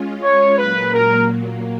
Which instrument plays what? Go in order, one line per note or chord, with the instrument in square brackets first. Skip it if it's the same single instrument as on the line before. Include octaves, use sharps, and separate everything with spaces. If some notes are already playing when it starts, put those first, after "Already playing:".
Already playing: [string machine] G#3 C#4 F4
[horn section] C#5
[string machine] A#2 F#3 A#3 [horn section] B4
[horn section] A#4